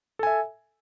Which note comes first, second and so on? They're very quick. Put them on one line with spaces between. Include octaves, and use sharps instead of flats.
A4 G#5 E5